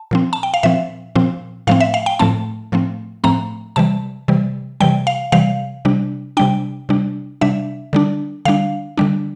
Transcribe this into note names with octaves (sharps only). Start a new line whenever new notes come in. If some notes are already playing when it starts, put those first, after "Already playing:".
Already playing: A5
A#2 F3 C4
A5
G5
F5
A#2 F3 C4 E5
A#2 F3 C4
A2 F3 A3 C4 F5
E5
F5
G5
A2 F3 A3 C4 A5
A2 F3 A3 C4
A2 F3 A3 C4 A#5
C3 E3 G3 A5
C3 E3 G3
C3 E3 G3 G5
F5
C3 E3 G3 F5
C3 G3 D4
C3 G3 D4 G5
C3 G3 D4
C3 G3 D4 E5
D3 G3 D4
D3 G3 D4 F5
D3 G3 D4